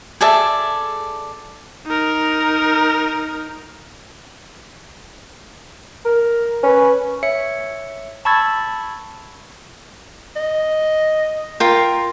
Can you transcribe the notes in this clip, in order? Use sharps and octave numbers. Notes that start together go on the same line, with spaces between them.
G#4 A4 D5 E5
D#4 A#4
A#4
C#4 B4
C#5 E5 C#7
A5 B5 C#6 E6 G#6 A6
D#5
F4 A#4 G5